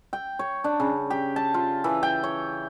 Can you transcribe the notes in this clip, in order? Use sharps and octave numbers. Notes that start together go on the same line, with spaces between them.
G5
C#5
D4
C#3
G4
A5
F4
E3
G5
C#5